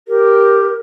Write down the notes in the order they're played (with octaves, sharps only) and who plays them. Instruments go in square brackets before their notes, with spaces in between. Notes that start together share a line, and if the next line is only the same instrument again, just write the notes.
[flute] G4 [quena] A#4